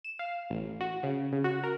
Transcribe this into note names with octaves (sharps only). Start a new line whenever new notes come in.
E7
F5
A1
F#4
C#3
C#3
F#4
A#4